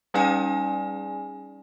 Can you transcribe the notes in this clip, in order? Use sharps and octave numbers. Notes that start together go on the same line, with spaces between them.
G3 C#4 D#4 G#4 D5 G#5